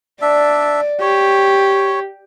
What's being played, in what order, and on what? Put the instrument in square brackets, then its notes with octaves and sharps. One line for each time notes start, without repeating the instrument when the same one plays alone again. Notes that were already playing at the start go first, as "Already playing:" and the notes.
[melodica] D4 E5 [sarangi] D5
[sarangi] G4 [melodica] C#5